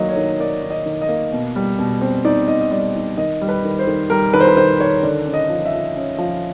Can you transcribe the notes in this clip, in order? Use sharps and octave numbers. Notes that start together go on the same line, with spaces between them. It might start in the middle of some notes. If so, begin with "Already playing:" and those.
Already playing: D#3 F#3 A#3 D#5
C#5
D#3
A#3 D5
D#3
D#5
D#3
D#5
A#3
B2
G3
B2
C4
D#4 D5
D#4 D#5
D#5
G3 D5
D#4
D#3 D#5
G3
B4
D#3
C5
D#3
G3 A#4
D#3 B4
C5
B4
D#3 C5
D#3 C#5
D3 D5
C#4
D#5
F3
E5
F3
C#4
F3